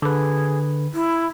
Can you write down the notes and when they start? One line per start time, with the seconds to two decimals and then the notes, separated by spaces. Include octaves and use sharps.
0.02 D3 G#4 B4
0.94 E4